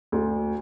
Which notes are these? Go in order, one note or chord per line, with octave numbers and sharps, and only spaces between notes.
D2